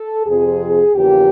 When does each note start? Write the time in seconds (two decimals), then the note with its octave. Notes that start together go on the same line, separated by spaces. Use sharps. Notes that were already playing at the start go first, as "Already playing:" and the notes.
Already playing: A4
0.27 F2 C3 F3 G#4
0.95 E2 C#3 F3 A#3 G4